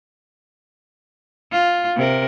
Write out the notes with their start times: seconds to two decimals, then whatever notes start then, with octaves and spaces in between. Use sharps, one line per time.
1.52 F4
1.96 C3 A#4